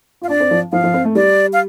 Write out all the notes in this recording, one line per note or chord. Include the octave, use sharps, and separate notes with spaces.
F4 F5
D4 D5
C4
F3
F3 F5
F3
C4
A3
G3 D5
F5